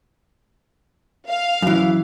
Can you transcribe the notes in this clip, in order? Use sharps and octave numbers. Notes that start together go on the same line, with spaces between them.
F5
F#2 E3